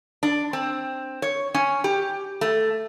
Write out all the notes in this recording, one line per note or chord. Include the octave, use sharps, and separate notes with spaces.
D4
C4
C#5
C#4
G4
A3